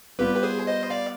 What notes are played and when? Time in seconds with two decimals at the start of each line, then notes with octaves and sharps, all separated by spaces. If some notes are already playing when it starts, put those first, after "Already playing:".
0.19 G3 B3 F4 G4 B4
0.36 B4
0.43 G#4 C5
0.67 C5 D#5
0.90 D5 F5